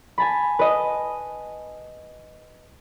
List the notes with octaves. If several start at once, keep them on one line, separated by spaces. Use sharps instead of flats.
G#5 A5 B5
B4 D#5